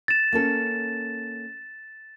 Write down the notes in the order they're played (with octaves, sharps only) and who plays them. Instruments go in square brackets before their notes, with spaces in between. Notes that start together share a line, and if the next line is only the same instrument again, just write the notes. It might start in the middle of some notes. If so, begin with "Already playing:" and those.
[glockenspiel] A6 E7
[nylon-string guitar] A#3 C#4 A4